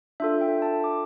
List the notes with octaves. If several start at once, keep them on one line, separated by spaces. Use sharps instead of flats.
D4 F4 A4 E5
G5
A5
D6